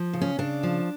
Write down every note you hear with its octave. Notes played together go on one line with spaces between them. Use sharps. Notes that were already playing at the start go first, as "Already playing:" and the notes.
Already playing: F3
C#3
C#4
C#3 D4
F3